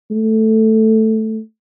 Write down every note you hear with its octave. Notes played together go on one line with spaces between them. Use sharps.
A3